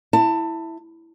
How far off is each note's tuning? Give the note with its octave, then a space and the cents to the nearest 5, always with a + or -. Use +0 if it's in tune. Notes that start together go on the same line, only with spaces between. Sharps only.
E4 +0 A5 +25